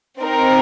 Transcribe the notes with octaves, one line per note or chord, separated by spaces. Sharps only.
C4 D#4 A#4